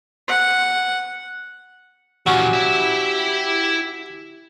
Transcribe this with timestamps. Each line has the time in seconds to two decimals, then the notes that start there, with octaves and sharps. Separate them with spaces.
0.28 F#5
2.26 A#2 E3 F#3 C#4 G4
2.54 E4 E5